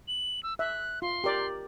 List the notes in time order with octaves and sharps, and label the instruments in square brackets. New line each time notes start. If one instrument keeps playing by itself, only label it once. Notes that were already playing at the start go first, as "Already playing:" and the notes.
[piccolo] F#7
E6
[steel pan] E5 [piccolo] F#6
[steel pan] F4 [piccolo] C6
[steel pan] G4 A#4 D5